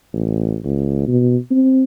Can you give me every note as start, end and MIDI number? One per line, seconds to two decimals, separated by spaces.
0.13 0.58 33
0.65 1.06 37
1.07 1.37 47
1.51 1.84 60